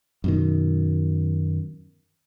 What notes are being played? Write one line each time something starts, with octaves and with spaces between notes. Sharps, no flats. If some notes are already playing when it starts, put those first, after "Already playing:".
F#2 B2 D#3